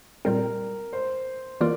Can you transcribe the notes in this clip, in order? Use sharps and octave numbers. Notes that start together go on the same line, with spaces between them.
A#2 G3 C4 A#4
C5
E3 A#3 F4 A#4 D5